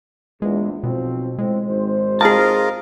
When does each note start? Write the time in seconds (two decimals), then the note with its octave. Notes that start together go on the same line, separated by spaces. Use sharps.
0.42 A#1 E2 G#3
0.83 B1 B2 F3 C4
1.39 A2 G#3 C4
1.68 G#1 C5
2.21 F4 G#4 A#4 D#5 A5